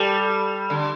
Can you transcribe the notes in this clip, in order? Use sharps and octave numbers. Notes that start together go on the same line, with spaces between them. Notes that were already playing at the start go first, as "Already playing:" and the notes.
Already playing: G3 G4 A4
D3